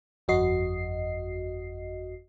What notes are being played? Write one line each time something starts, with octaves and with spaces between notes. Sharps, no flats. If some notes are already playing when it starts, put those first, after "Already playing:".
G1 F2 F#4 D#5 C7